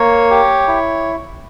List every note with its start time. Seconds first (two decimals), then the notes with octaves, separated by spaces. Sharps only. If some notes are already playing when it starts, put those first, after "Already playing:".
Already playing: A#3 C#5
0.30 G4
0.68 E4